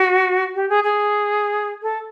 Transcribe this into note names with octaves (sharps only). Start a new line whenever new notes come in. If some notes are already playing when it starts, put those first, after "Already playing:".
Already playing: F#4
G4
G#4
G#4
A4